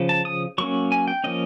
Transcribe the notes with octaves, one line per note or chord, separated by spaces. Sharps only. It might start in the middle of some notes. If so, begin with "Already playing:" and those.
Already playing: C#3 F3
A5
D#6
F#3 A#3 C#4 C#6
G#5
G5
F3 A#3 C#4 D#5